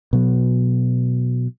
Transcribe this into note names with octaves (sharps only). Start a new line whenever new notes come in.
B2 F#3